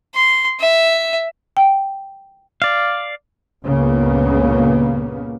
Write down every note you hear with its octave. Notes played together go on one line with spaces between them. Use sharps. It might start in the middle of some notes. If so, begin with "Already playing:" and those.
C6
E5
G5
D5 F5
C#2 G2 A#2 C#3 A#3 B3